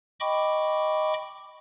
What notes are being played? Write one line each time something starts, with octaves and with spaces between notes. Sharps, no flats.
D#5 G5 B5 C#6 D6